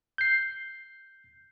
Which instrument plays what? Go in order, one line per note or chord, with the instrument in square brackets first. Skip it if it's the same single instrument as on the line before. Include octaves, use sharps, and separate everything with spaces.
[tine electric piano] G6 C7